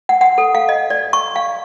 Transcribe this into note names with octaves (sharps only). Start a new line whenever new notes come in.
F#5
F#5
A4
F5
D#5
D5
C#6
F5